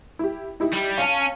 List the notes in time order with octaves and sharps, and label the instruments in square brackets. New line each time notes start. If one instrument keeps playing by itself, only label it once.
[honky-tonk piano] E4 G4
D#4 E4 G4
[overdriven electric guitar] G3
[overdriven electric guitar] C#4 [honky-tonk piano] F5 A5